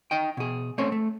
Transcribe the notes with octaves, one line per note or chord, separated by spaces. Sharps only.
D#4 D#5 G5
B2 G#4
A3 C4 C#4 C#5
A3